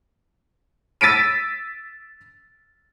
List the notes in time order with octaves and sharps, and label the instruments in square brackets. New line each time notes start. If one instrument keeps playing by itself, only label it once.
[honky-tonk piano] E6 A6 B6 D7 D#7